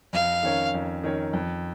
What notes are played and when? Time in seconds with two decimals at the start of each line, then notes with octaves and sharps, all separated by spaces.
0.13 F2 F5
0.43 D#3 C#4 A#4 C#5
0.74 F2
1.03 D#3 C#4 A#4 C#5
1.33 F2